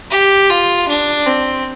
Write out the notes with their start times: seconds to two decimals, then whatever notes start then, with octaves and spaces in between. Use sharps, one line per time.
0.11 G4
0.50 F4
0.88 D4
1.26 C4